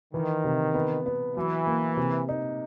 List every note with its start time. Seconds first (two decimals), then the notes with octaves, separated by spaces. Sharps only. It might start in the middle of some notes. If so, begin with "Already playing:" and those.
0.14 D#3 E3
0.44 C3
0.74 B3
1.06 B3
1.36 E3 F#3
1.67 A#3
1.97 C3
2.29 D#4